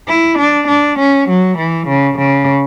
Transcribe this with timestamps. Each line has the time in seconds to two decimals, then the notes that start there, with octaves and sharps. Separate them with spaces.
0.09 E4
0.38 D4
0.68 D4
0.99 C#4
1.28 F#3
1.58 E3
1.88 C#3
2.17 C#3